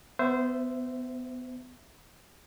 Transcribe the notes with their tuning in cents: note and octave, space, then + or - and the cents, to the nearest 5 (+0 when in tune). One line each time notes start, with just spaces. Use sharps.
B3 +25 C5 -15 E5 +10